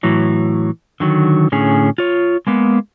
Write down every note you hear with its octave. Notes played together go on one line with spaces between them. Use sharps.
A2 E3 F#3
D3 D#3 F#3
A2 D3 C#4 G#4
F4 C#5
G#3 A#3 B3